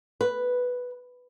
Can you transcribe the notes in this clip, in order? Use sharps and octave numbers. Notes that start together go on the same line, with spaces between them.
B4